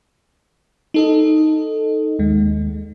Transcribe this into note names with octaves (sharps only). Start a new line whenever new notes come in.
D#4 A4 D#5
D#2 G#3